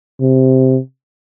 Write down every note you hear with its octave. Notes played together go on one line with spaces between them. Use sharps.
C3